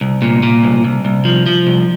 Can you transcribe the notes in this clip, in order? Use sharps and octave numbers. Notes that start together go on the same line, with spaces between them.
C2
A#2
A#2
C2
C2
C2
F3
F3
C2